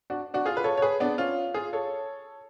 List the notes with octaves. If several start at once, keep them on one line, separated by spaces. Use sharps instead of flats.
D4 F#4
D4 F#4
F4 G#4
B4
A4 C#5
C#5
G#4 B4
B3 D4
C#4 F4
F4 G#4
A4 C#5